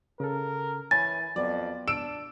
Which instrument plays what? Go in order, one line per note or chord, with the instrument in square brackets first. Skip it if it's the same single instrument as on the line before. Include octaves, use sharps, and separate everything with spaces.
[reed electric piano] C#3 A4 [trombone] A#4
[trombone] E3 [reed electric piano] C#5 B5 [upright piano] G#5 [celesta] A6
[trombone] F2 [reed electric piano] F#3 B3 [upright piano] D5
[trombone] D4 [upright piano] E6 D7 E7